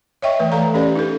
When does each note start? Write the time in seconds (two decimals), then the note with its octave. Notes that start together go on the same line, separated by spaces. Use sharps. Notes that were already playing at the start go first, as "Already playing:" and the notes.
0.22 C#5 D#5 E5 G5 C#6
0.39 E3 A3 B4
0.52 E3 A4 F5 A#5
0.74 C#4 G4 B4 D5
0.95 D#4 A4